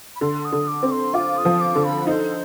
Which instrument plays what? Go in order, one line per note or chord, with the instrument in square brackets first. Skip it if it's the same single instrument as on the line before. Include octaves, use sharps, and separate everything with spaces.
[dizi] B5
[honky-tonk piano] D3 [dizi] C6
[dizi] D#6
[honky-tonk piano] D3
[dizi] D6
[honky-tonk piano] C4
[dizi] C6
[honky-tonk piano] F4 [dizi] D6
[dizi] D#6
[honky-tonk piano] F3
[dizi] D6
[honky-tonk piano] D3
[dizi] B5
[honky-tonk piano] D#4 [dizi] C5